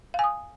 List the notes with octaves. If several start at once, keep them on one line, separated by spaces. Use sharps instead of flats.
F5 G#5 D#6